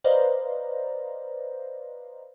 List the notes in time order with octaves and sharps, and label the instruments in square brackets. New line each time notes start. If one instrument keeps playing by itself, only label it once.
[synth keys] B4 C5 D5 D#5 F5 A#5